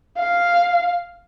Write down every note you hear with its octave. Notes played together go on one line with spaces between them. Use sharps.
F5